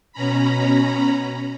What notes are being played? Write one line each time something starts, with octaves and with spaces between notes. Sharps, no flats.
B2 C#4 A#5 B5